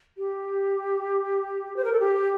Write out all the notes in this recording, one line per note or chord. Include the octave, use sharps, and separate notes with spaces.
G4
C5
A#4
A4
G4